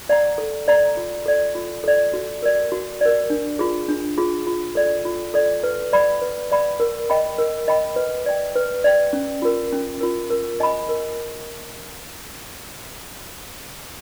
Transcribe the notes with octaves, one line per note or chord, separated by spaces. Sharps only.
D5 F#5 A#5
A4
D5 F#5 A#5
F4
A4 D5
F4
A4 D5
F#4
A#4 D5
F#4
A#4 D5
D4
F4 G#4
D4
F4 G#4
F4
A4 D5
F4
A4 D5
B4
D5 F#5 B5
B4
D5 F#5 B5
A#4
D#5 G5 B5
A#4
D#5 G5 B5
B4
D5 G5
B4
D5 G5
C#4
F4 A#4
C#4
F4 A#4
A#4
D#5 G#5 B5
A#4